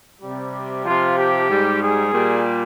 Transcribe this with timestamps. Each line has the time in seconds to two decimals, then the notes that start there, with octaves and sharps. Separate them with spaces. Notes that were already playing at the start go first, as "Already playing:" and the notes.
0.21 C3 G3
0.85 C3 F3 F4
1.17 G4
1.49 G#2 G3
1.80 G#4
2.12 A#2 G3